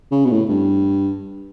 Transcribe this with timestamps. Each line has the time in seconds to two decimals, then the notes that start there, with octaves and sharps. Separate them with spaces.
0.11 C#3
0.25 B2
0.31 A2
0.49 G2